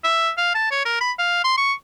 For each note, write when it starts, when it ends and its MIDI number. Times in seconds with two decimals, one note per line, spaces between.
0.04 0.31 76
0.37 0.52 77
0.54 0.70 81
0.71 0.85 73
0.85 0.97 70
1.01 1.12 83
1.18 1.42 77
1.44 1.56 84
1.57 1.73 85